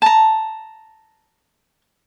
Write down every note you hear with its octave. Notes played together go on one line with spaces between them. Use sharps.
A5 A#5